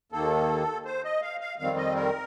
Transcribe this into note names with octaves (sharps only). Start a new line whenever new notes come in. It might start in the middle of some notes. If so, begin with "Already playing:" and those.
D#2 D#3 A#3 A4
C5
D#5
F5
F5
F2 D#3 G3 C4 F5
D#5
A#4